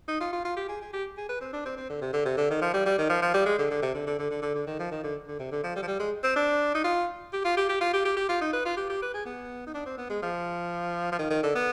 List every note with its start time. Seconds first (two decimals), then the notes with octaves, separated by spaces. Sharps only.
0.08 D#4
0.21 F4
0.33 F4
0.45 F4
0.57 G4
0.69 G#4
0.81 G#4
0.93 G4
1.18 G#4
1.29 B4
1.41 C4
1.53 D4
1.66 C4
1.78 C4
1.90 D3
2.02 C3
2.13 D3
2.26 C3
2.38 D3
2.50 D#3
2.62 F3
2.74 G3
2.86 G3
2.99 D#3
3.10 F3
3.22 F3
3.34 G3
3.46 G#3
3.59 D3
3.71 D3
3.83 C3
3.95 D3
4.07 D3
4.19 D3
4.31 D3
4.42 D3
4.55 D3
4.67 D#3
4.79 F3
4.92 D#3
5.04 D3
5.27 D3
5.39 C3
5.52 D3
5.64 F3
5.76 G3
5.83 F3
5.88 G3
5.99 G#3
6.24 C4
6.36 D4
6.75 D#4
6.85 F4
7.33 G4
7.45 F4
7.57 G4
7.69 G4
7.81 F4
7.93 G4
8.05 G4
8.17 G4
8.29 F4
8.41 D#4
8.53 B4
8.65 F4
8.77 G4
8.90 G4
9.02 B4
9.14 G#4
9.26 B3
9.67 D#4
9.75 D4
9.86 C4
9.98 B3
10.10 G#3
10.22 F3
11.12 F3
11.19 D#3
11.31 D#3
11.43 D3
11.55 B3